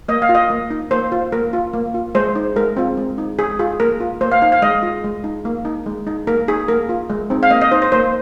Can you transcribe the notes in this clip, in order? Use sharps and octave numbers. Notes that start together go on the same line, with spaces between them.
A#3 D#5
F5
F4
D#5
A#3
D#4
A#3 C5
F4
A#3 A#4
F4
A#3
F4
G#3 C5
D#4
G#3 A#4
C4 F4
G#3
D#4
G#3 G#4
F4 G#4
A#3 A#4
F4
A#3 C5
F5
D#4 F5
F5
G#3 D#5
F4
G#3
D#4
A#3
D#4
G#3
D#4
A#3 A#4
D#4 G#4
A#3 A#4
F4
G#3
C4 D#4
F5
A#3 D#5
D#5
D#4 C5
C5
A#3 C5